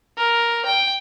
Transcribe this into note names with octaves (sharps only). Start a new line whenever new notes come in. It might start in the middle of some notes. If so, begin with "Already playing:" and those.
A#4
G5